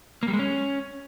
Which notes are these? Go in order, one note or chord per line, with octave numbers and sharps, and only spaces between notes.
A#3
G3
G#3
C#4